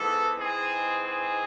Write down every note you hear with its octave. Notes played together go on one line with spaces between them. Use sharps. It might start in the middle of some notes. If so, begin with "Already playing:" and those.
Already playing: G#2 E3 B3 A4
G#2 E3 G#3 C4 G#4
G#4